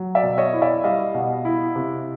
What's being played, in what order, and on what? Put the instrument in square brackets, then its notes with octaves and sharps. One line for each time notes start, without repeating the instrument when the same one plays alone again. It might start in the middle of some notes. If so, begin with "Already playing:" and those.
Already playing: [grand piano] F#3
D5 E5
B2
C#5 D#5
E4
D5 E5
G3 D#5 F5
B2
E4
C3